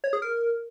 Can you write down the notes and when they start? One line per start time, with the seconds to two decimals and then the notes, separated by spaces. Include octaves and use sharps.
0.04 C#5
0.13 G#4
0.22 A#4